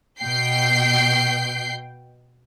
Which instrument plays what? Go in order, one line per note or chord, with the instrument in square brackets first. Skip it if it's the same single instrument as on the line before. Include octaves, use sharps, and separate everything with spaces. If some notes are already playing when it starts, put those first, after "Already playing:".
[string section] B2 G5 G6 C7